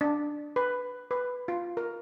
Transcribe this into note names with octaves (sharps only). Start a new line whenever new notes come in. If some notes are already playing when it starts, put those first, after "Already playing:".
D4
B4
B4
F4
A#4